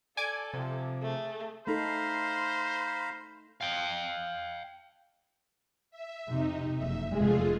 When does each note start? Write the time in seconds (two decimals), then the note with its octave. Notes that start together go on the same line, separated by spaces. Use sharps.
0.17 A4 D5 G#5 D6 G#6
0.54 C3 F3
1.02 A3 G#4
1.67 A3 D#4 A4 C5 F5 A#5 B5
3.61 F5 G5
5.91 E5
6.28 F2 C3 D#4
6.76 F#1 F2 E5
7.12 F1 E2 G#3 A3 F4 G#4